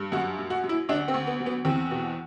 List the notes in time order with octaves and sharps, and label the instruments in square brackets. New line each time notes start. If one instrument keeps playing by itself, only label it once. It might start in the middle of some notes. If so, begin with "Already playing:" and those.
Already playing: [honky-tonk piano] G2
F#2 F#4
F#3
F#4
F#3
E4
D2 D4
C4
D2
B3
F#3
B3
E2 C4
B2